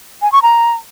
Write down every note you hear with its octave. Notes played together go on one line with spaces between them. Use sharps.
G#5
C#6
A#5